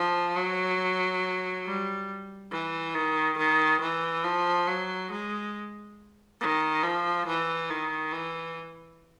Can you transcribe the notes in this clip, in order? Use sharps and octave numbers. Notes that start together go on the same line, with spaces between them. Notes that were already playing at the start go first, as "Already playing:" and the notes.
Already playing: F3
F#3
G3
E3
D#3
D#3
E3
F3
F#3
G#3
D#3
F3
E3
D#3
E3